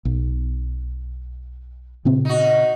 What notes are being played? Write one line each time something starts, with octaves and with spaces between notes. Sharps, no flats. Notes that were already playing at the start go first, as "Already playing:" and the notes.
B1
A#2 C#3 C4
D#4 F#4